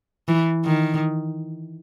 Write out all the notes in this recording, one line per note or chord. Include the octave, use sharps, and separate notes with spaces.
E3
D#3